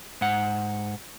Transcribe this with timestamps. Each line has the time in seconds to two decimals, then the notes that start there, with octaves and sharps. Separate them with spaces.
0.21 G#2 F#5